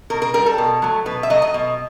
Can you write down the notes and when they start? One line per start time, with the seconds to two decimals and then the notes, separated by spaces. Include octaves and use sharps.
0.10 B2 A#4
0.22 A#4
0.34 G3 A#4
0.46 A4
0.58 B2
0.82 F#3 A3
1.06 B2 B4
1.23 E5
1.30 F#3 A3 D#5
1.42 D#5
1.54 B2